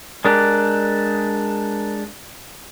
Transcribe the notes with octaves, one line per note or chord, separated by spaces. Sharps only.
G#3 D4 G4 A#4 A#5 F#6